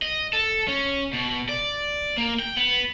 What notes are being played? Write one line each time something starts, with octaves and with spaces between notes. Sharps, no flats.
D#5
A4
C#4
B2
D5
A#3
G5
B3